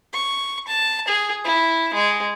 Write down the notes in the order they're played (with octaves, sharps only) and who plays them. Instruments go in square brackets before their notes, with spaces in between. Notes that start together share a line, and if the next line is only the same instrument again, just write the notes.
[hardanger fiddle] C#6
A5
G#4
E4
G#3